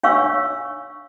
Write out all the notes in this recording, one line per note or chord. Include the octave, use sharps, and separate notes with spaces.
D4 C#5 F5 C#6 E6